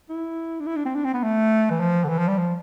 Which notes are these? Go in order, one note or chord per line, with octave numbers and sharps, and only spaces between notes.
E4
D4
E4
D4
C4
D4
C4
B3
A3
E3
F3
D3
E3
F3
G3
F3